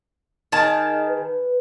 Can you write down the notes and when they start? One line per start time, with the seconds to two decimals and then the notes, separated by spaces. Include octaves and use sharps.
0.52 D#3 G#4 A5
1.09 B4